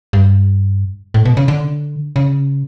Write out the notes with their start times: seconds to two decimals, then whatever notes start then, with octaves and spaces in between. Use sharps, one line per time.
0.13 G2
1.14 A2
1.25 B2
1.37 C#3
1.48 D3
2.16 C#3